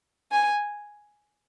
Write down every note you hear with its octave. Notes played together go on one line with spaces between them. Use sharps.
G#5